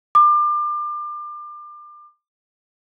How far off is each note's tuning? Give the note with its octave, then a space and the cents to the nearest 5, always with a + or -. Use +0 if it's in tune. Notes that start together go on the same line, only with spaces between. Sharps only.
D6 +30